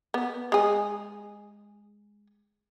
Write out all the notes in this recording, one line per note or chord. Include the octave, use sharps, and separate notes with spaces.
B3
G#3 G#4